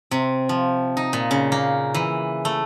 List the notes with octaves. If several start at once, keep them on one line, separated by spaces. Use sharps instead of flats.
C3
F3
D#4
A#2
C#3
A#3
E3
A3